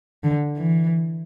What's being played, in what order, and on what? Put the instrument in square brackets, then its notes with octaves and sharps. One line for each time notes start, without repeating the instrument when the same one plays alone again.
[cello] D3
E3